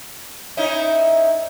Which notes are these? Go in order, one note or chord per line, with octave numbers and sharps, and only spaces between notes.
C#4 D#4 E4